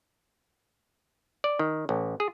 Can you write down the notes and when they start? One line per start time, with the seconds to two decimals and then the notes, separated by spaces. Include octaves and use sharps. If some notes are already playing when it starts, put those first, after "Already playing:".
1.44 D5
1.59 D#3
1.89 A1
2.20 G#4